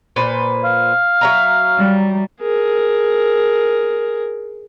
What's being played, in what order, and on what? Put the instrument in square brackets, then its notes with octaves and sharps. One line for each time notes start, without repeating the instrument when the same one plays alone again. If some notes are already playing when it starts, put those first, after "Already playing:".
[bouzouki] A#2 B4 C5
[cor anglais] F5
[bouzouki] F#3 E5 A#5
[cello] G3
[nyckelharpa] G#4 A#4